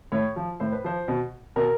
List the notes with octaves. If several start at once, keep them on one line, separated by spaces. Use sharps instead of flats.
A2 C#5
F3
A2 C5
B4
F3 C5
B2
B2 A#4